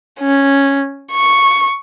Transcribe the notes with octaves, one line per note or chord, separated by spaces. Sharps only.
C#4
C#6